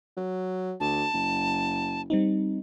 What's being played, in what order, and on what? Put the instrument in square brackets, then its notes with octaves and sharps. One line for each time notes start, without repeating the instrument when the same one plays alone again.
[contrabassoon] F#3
[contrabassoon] D2 [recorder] A5
[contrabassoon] F#1
[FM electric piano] G3 C4 D#4